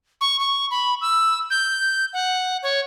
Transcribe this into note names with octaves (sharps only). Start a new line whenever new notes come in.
C#6
C#6
B5
E6
G6
F#5
C#5